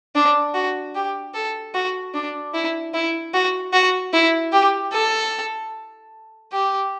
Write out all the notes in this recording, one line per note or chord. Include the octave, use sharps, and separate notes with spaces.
D4
F#4
G4
A4
F#4
D4
E4
E4
F#4
F#4
E4
G4
A4
G4